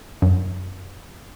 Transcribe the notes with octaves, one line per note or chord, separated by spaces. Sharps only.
F#2